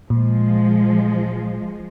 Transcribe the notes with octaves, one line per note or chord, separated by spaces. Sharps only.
A#2 F3 G#3